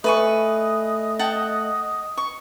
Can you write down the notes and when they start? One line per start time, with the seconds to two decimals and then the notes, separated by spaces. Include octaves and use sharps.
0.04 A3 B4 D#5 G#5 C#6
1.19 F#5 G5 A5
2.17 C#6